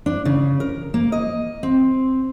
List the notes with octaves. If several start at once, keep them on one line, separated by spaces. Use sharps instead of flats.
D4
C#3
A#4
A#3
D#5
C4